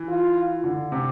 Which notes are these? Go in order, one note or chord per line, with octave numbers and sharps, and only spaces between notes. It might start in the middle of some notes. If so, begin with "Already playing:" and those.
Already playing: E3
F4
D3
C3